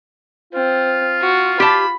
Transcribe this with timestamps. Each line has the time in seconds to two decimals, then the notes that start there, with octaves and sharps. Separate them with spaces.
0.53 C4 F4
1.21 F#4
1.60 G4 A5 B5